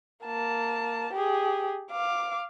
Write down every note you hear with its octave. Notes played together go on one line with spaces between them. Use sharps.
A#3 A5
G4 G#4
F5 D6